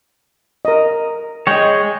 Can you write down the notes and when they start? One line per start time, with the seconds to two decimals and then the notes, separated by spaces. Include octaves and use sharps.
0.65 A#4 D#5
1.47 G#3 C#5 D#5 G5